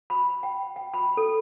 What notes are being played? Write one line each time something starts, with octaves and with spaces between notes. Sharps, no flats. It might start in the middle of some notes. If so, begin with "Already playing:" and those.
B5
G5
G5
B5
A4